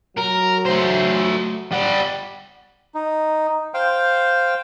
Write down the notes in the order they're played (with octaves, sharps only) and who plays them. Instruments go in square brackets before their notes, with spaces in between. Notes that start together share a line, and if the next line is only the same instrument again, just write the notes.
[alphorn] F#3 [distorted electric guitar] A#4
[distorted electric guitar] A3 C5
G3 F#5
[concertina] D#4
C5 F5 G5